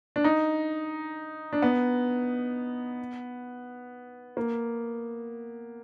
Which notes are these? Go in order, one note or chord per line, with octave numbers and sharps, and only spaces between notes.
D4
D#4
D4
B3
A#3